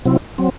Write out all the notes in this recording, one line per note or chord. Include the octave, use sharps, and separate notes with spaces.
C3 F#3 C4 E4
F#3 C4